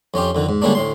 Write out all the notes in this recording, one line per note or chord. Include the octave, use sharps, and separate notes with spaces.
F2 C#4 F4 G4
F2 D3 D#3
G#2
D3 G3 G#3 A#3 C#4 D4
D2 A2 C6